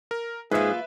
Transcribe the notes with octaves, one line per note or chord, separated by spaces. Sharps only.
A#4
G#2 A#3 F4 G#4 B4 E5